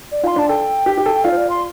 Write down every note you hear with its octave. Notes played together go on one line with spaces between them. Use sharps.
D5
F4 F5 C6
D4 D5 A5
A4 G5
G4
G4
A4
F4 D5 F5
C5
D5
C6